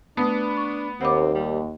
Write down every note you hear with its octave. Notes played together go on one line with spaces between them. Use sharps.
A3 B3 D4 B4 D#6
C#6
D#2 C4 F#5 B5 D6
G3